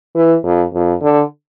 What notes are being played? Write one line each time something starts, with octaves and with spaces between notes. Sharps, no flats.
E3
F2
F2
D3